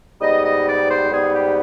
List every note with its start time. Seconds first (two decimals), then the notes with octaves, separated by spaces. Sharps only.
0.21 G#2 G3 B3 D#5
0.44 D#5
0.66 D5
0.88 C5
1.11 G#2 G3 B3 G#4
1.34 G4